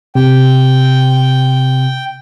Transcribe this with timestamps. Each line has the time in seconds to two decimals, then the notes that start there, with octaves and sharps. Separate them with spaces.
0.15 C3 G5